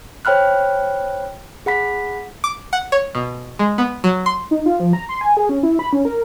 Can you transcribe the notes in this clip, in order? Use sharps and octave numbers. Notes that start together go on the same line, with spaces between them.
C5 C#5 G5 B5 F6 F#6
G#4 F#5 B5 B6
D6
F#5
C#5
B2
G#3
B3
F#3
C6
D#4
F4
F3
A#5
C6
G#5
G#4
C#4
E4
B5
C#4
A#4